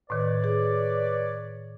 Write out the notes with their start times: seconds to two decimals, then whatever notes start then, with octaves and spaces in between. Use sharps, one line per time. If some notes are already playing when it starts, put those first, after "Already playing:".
0.10 A2 D#3 B4 C#5 D5
0.44 G#4